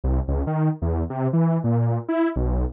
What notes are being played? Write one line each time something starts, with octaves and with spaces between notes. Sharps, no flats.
C2
C#2
D#3
E2
C3
E3
A#2
E4
B1